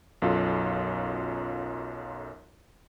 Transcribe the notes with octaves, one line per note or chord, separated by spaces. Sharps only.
B1 F#2 F4 A4